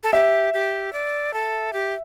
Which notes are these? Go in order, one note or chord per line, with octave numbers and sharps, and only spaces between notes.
A4
G4 E5
G4
D5
A4
G4